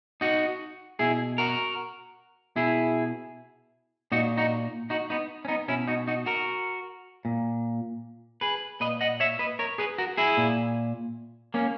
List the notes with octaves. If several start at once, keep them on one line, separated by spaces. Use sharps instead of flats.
D#4 F#4
B2 E4 G#4
F#4 A#4
B2 E4 G#4
A#2 D#4 F#4
D#4 F#4
D#4 F#4
B3 D#4
C#4
B3 D#4
B2 C#4 E4
D#4 F#4
D#4 F#4
F#4 A#4
A#2
G#4 B4
A#2 B4 D#5
D#5 F#5
C#5 E5
B4 D#5
A#4 C#5
G#4 B4
F#4 A#4
E4 G#4
A#2
A#3 C#4